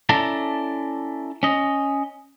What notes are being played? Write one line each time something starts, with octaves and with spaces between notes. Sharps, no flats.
C#4 E4 A4 D5 A5 A#5
C#4 D#5